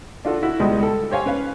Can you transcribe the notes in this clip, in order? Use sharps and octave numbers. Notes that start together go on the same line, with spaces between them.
D4 F4 F#4 A4
E4 F#4
C#2 B2 G3 G#3 D#6
A4
G4 C5 C#5 F5 G#5
C#4 B4 F5